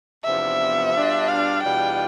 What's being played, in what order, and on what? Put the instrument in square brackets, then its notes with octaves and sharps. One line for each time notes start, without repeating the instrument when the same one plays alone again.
[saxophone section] E2 C3 F3 B3 D4 [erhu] E5
[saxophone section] B2 G3 D4 F4
[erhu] F5
[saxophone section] E2 B2 G3 D4 F4 [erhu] G5